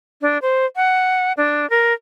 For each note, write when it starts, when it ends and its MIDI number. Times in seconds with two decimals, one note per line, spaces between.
0.22 0.38 62
0.42 0.65 72
0.76 1.32 78
1.37 1.69 62
1.70 1.93 70